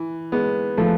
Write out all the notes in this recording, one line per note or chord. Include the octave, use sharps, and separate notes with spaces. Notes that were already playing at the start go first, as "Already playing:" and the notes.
Already playing: E3
G#3 B3
F3 A3